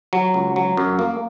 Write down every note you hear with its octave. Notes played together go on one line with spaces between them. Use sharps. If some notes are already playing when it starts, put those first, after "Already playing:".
F#3
C#2
F#3
F#2
A#3